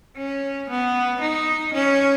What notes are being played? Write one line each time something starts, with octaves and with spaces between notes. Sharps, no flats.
C#4
B3
D#4
C#4